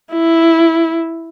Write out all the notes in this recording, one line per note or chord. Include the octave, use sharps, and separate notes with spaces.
E4